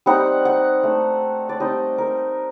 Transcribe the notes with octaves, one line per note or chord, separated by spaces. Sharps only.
G3 C4 D#4 F#5
F#5
A3 D4
D5
G3 C4 D#4 D#5
A#4